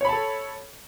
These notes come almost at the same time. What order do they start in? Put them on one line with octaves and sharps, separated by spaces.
C#5 B5 A5 A4